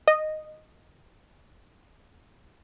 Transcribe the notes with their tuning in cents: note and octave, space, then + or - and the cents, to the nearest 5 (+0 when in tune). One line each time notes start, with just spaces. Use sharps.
D#5 -10